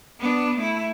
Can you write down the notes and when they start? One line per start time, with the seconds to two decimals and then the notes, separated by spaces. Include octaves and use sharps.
0.19 B3 D4
0.58 A3 E4